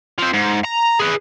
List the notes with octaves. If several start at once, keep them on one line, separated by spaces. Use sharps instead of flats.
F3 C4
G#2
A#5
G#4 B4